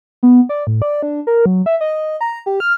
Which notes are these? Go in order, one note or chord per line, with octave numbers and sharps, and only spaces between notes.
B3
D5
A2
D5
D4
A#4
F#3
E5
D#5
A#5
G4
F6